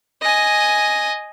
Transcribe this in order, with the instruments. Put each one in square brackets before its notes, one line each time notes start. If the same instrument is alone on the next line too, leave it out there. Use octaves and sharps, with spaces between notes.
[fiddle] D#5 G#5